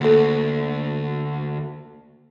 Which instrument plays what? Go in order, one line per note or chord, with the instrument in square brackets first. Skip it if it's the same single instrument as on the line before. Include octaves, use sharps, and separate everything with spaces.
[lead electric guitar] D2 [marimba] A#3 A4